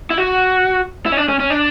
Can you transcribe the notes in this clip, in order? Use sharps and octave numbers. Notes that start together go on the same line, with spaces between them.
E4
F#4
E4
C#4
D4
C#4
C#4
D4